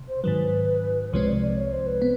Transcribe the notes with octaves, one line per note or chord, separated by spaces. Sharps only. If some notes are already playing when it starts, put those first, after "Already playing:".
Already playing: C3
C5
G#2 D#3 F#3 B4
C2 C3 F3 G#3 C4 C#5
D5
D5
C#5
C5
B4
B3